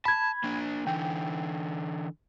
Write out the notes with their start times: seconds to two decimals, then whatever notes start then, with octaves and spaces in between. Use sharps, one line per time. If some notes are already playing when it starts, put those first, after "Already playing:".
0.05 A5 B5 G#6
0.44 A#3 D4
0.87 D3 E3 G5